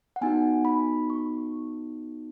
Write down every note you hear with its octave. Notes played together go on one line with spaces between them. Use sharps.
F#5
B3 D#4 F#4 G#5
B5
C#6